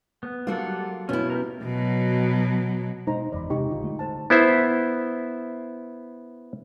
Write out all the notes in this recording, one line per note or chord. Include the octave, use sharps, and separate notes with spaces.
B3
F#3 G3 A#3 F4 A4 F#5
B2 C#4 E4
G4 A#4
B2 F#3
B2 G#3 D#4 C5 A#5
F#1 E2 D5 B5
C3 G#3 D#4 G4 C#6
A1 D3 F4
D3 G#3 A3
C5 A5
B3 E4 C5 E5